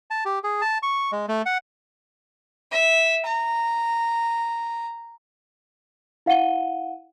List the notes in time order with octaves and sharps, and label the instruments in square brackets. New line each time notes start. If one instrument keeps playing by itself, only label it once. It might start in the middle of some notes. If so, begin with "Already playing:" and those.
[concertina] A5
G4
G#4
A5
C#6
G#3
A3
F#5
[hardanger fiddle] E5
A#5
[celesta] E4 F5 F#5 D#7 G7